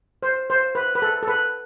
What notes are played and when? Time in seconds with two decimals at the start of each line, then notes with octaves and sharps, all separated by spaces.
0.23 C5
0.50 C5
0.75 B4
0.95 B4
1.02 A4
1.23 A4
1.28 B4